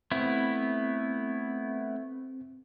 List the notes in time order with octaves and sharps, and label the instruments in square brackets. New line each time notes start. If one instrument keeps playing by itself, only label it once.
[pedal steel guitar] A3 B3 E4 [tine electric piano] C4